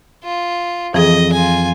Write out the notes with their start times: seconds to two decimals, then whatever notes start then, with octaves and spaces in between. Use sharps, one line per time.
0.24 F4
0.94 F2 E3 G#4 D#5
1.33 F4 G#5